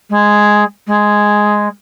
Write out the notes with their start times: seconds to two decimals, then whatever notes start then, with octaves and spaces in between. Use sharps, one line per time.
0.10 G#3
0.87 G#3